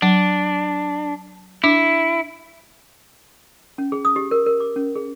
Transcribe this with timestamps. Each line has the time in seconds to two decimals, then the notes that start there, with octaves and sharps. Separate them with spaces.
0.02 F#3 D4
1.64 D4 E4
3.78 C#4
3.92 G#4
4.05 D#6
4.16 G4
4.31 A#4
4.46 A#4
4.60 D6
4.76 C#4
4.96 G#4